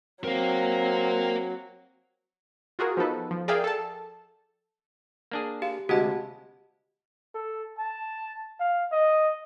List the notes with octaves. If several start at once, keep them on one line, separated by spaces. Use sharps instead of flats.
F#3 C4 A#4 F5
F4 F#4 G#4 A#4
F3 B3 D#4 A4 B4
F3
G#4 A#4 D5 E5 F5 G5
A4 A5
A#3 D4 G#4
G4 F5
D2 C3 G#3 F#4 G4 D#5 F#5 A5
A4
A5
F5
D#5